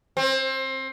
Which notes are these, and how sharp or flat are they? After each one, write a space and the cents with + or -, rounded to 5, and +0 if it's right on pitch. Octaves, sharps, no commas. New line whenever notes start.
C4 +25